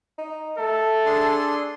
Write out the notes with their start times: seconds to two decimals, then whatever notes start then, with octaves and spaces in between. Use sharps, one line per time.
0.18 D#4
0.58 A3 A4
1.06 D4 G#4 C6